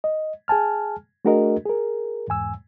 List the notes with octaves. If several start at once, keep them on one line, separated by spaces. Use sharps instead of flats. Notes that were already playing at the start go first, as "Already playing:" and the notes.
D#5
G#4 G#5 A5 F6
A3 D4 F#4 G#4 A#4 D#5
G#4 A#4
E2 G#2 G#5 E6